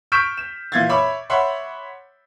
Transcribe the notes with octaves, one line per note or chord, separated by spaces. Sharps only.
C#6 F6 G6 B6 D7 E7
E7
A#2 E3 E4 F5 G#6 A6
C#5 E5 B5 D6
C#5 E5 F#5 B5 C6